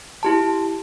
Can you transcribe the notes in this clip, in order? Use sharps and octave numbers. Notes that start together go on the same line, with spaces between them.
E4 G4 A5